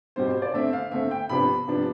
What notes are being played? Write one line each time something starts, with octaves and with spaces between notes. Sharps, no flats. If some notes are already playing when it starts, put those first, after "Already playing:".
B2 G3 C4 C5
C5
D5
D3 A3 C4 E5
F5
D3 A3 C4 E5
G5
C3 F3 B3 D4 B5
C3 F3 B3 D4